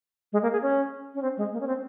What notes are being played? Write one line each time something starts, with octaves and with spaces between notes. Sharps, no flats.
G#3
A#3
G#4
C#4
C#4
C4
G#3
A#3
C#4
C4